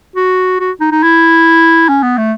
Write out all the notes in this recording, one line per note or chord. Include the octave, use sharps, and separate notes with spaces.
F#4
F#4
D#4
D#4
E4
C#4
B3
A3